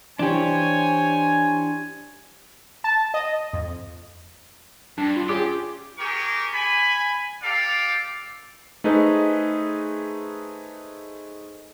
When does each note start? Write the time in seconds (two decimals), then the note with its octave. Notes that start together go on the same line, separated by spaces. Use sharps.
0.19 E3 D4 G4 C5 C#5 G#5
2.84 A5
3.14 D#5
3.53 F2
4.98 G2 D4
5.16 F4
5.29 C#4 G4 G#4 D6
5.98 G4 G#4 A#4 C#6
6.53 G#5 B5
7.43 G4 A4 D5 F5
8.84 A3 D#4 G#4 B4 C5 D#5